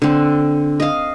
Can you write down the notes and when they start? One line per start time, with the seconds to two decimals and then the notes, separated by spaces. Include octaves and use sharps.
0.02 D3 C4
0.80 D#5 F5